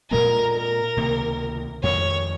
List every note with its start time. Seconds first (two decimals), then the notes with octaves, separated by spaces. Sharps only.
0.11 A#2 G#3 C4 A#4
0.54 A#4
0.97 C#2 C3 D#3 A#3
1.83 F2 D#3 G#3 C#5